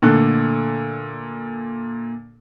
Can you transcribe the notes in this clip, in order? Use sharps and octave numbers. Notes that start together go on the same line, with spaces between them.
A#2 D3 A3 A4 F#6